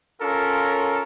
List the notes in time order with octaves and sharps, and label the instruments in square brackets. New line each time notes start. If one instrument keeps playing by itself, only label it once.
[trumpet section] C#4 F4 A4 A#4